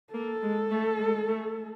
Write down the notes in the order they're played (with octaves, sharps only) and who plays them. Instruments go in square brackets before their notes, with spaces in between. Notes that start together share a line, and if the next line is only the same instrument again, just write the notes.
[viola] A#3 [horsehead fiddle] A4
[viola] G#3
A3
G#3
A3